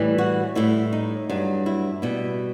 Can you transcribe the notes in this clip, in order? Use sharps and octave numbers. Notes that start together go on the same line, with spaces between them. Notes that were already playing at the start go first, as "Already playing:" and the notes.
Already playing: A2 E3 G3
F#4
A2 G3 E4
D#4
G2 F#3
E4
B2 G3 E4